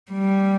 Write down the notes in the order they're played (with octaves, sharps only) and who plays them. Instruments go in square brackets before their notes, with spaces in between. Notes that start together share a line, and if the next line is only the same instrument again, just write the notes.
[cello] G3